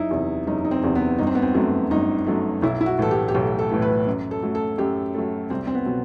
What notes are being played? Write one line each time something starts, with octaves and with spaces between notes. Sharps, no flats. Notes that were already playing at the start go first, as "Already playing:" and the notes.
Already playing: F#1 D#4 E4
E2 C3
F#1 D#4
D#4
C4
E2 C3
B3
G1 D#4
C4
B3
C4
F#2 F#3 A3
G1 D#4
F#2 F#3 A3
B1 E4
E4
F#4
A2 E3 A3 A4
G4
G4
B1 A4
A4
A2 E3 A3
B4
F#2
A4
F#3 A3
A4
F#2 G4
F#3 A3
C2 C4
C4
B3
B2 F#3